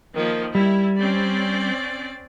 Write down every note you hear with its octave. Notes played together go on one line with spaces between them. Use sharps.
D#3 F3 A#3
G3 E4
C4 C#4 D5